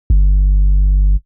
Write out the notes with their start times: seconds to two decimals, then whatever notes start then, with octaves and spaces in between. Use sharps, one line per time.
0.10 G1